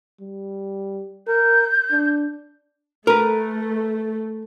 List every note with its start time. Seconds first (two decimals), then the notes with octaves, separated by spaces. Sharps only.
0.20 G3
1.28 A#4 G6
1.91 D4
3.07 A3 A#4 B4